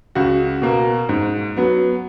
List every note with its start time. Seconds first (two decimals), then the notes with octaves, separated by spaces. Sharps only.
0.15 C#2 F#4
0.62 B2 A#3
1.09 G#2
1.57 F#3 B3